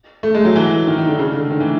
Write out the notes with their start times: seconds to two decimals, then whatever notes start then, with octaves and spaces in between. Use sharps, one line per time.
0.23 A3
0.35 G#3
0.45 F#3
0.56 E3
0.87 D#3
0.98 D#3
1.08 D3
1.18 C#3
1.34 D3
1.50 D#3
1.60 E3